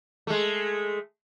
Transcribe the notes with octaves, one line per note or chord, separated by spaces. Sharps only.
G#3 A3